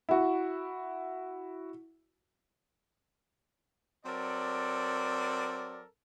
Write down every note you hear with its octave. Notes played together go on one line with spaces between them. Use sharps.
E4 F#4
F#3 C4 A4 A#4 D5